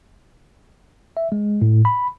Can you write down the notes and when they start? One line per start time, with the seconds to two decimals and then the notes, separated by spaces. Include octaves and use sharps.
1.17 E5
1.32 G#3
1.62 A2
1.85 B5